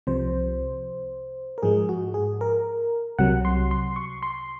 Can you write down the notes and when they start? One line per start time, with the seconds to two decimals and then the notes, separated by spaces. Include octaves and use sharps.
0.07 C2 C3 F3 C5
1.58 A#4
1.62 G#2 F3 G#3 G#4
1.89 F#4
2.14 G#4
2.41 A#4
3.19 C2 C3 F#3 F#5
3.45 C6
3.71 C6
3.96 C#6
4.23 C6